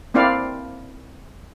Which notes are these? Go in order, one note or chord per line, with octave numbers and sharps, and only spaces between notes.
A#3 C4 D4 E4 D5 F5